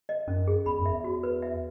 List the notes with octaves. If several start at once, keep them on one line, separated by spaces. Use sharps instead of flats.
D#5
F#2 C#4
G#4
E2 B5
F#2
E5
E2
F#4
B4
E5